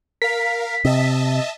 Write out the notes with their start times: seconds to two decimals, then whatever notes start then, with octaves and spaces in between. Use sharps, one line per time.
0.22 A#4 F5 B6
0.85 C3 D#5 E5 A5